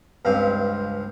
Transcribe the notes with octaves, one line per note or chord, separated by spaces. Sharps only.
C#2 G2 C4 F5